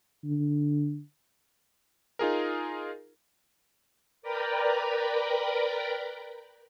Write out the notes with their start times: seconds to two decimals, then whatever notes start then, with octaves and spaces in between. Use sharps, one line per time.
0.24 D3
2.19 D#4 F4 G#4 A#4
4.22 A#4 B4 D5 G5 A#5 B5